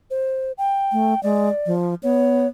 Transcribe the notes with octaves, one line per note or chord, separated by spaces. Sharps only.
C5
G5
A3
G#3 D5
F3
B3 C#5